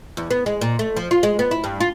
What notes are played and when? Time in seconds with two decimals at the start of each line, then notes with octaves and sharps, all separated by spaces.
0.17 E2
0.31 B3
0.46 G#3
0.61 A#2
0.79 A3
0.97 F3
1.11 F4
1.23 G#3
1.39 B3
1.51 E4
1.64 G2
1.80 F4